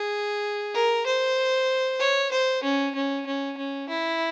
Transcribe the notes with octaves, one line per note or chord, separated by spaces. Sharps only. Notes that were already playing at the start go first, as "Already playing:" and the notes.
Already playing: G#4
A#4
C5
C#5
C5
C#4
C#4
C#4
C#4
E4